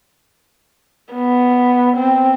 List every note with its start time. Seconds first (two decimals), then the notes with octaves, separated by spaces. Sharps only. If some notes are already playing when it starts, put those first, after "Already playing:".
1.13 B3
1.97 C4